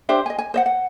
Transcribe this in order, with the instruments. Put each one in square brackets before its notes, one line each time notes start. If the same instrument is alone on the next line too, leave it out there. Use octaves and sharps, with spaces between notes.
[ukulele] D4 G4 C5 E5
D#5 G#5
G#5
C5 D#5 F#5
F#5